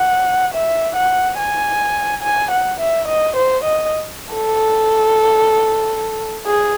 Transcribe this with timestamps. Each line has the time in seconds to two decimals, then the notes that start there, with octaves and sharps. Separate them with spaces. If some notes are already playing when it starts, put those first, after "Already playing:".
Already playing: F#5
0.54 E5
0.96 F#5
1.38 G#5
2.23 G#5
2.51 F#5
2.80 E5
3.08 D#5
3.36 C5
3.64 D#5
4.34 A4
6.47 G#4